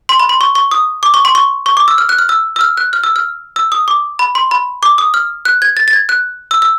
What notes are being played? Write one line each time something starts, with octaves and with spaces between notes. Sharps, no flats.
C6
B5
C6
C#6
C#6
D#6
D6
C#6
C6
C#6
C#6
D6
E6
F6
F#6
F6
E6
E6
F6
F#6
F6
E6
F6
E6
D#6
D6
B5
C6
B5
D6
D#6
F6
F#6
G#6
A6
A6
G#6
F#6
E6
E6